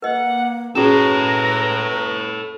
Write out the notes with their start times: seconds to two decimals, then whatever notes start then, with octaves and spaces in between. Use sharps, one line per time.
0.02 A#3 B4 D#5 F#5
0.75 C#4 F#4 G#4 A4 B4 C#5 A#5